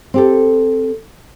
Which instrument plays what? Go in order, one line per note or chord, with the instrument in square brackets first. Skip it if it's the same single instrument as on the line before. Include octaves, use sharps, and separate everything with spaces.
[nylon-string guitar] C4 G4 A4